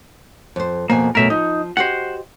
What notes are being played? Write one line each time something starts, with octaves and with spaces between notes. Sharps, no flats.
F2 C5
F2 B2 A#3 G#5
F#2 B2 A3 A#4 E5
F3 D#4
F#4 G4 C5 D#5 F#5